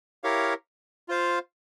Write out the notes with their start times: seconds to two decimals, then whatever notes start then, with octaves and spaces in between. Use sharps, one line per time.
0.24 E4 G4 A#4 C#5 F5
1.09 F4 C5 F5